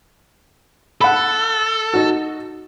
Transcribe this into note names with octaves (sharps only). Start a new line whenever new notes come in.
A4 F#5 B5
D#4 F#4